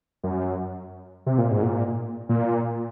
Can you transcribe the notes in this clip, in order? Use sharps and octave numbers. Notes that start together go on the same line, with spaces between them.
F#2
C3
A#2
G#2
A#2
A#2